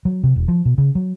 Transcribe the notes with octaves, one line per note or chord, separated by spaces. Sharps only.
F#3
C3
E1
F3
B2
C#3
F#3